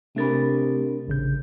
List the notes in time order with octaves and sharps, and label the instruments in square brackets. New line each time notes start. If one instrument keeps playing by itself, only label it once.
[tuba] C3 [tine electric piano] A3 A6 [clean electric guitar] D4 A#4 B5
[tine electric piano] A1 C#3 G6